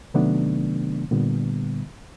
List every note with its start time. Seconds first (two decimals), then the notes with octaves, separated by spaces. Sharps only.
0.14 C3 D#3 F#3 A3 B3 D4
1.11 A#2 D3 G3 B3